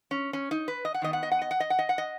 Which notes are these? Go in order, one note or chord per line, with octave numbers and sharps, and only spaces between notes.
C#4
C#4
D#4
B4
D#5
F#5
D#3 B3 D#5
F#5
D#5
F#5
D#5
F#5
D#5
F#5
D#5
F#5
D#5